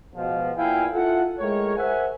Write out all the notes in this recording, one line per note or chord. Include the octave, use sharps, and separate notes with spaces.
B2 F3 G#3
E2 A#2 E4 F5 G5 G#5
E4 F4 A4 F#5
A2 G#3 A#4 C#5
A#4 C5 E5 F#5 G#5